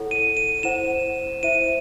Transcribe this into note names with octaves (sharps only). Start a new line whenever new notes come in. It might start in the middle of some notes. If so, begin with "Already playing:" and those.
Already playing: E4 A4 C#5 F#5
D#7
D#7
E4 C5 F#5 E7
E4 C5 E5 D#7